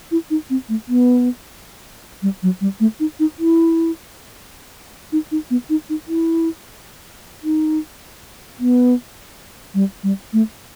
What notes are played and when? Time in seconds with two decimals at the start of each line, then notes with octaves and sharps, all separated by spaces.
0.11 E4
0.30 D#4
0.50 C4
0.69 A3
0.89 B3
2.22 G3
2.43 F#3
2.61 G3
2.80 A3
3.00 D#4
3.20 D#4
3.39 E4
5.12 D#4
5.32 D#4
5.50 B3
5.70 D#4
5.90 D#4
6.08 E4
7.44 D#4
8.60 B3
9.74 G3
10.03 G3
10.33 A3